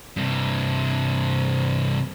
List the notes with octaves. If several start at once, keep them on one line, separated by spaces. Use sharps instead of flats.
G2 C3